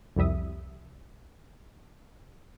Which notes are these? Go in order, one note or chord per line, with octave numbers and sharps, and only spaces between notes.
C2 F2 G3 E5 D#6